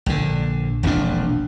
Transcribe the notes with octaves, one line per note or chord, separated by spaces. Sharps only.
A#1 D3
E1 A#1 F2 D4